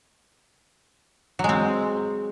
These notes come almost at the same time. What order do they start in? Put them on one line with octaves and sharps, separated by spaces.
F#3 G#3 C4